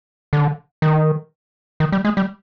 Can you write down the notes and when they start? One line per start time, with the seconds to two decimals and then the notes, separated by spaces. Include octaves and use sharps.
0.33 D3
0.82 D#3
1.80 D#3
1.92 G3
2.05 G#3
2.17 G3